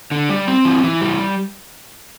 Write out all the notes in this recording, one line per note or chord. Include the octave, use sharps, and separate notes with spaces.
D3
G3
C4
E3
E3
G3